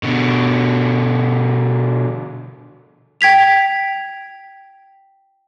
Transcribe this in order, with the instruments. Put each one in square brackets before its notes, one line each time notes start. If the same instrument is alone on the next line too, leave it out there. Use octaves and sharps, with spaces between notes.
[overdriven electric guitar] B2 D3
[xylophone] G5 G#6 B6 F7